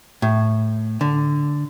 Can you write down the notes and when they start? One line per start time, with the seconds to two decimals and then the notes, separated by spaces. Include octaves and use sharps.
0.22 A2
1.01 D3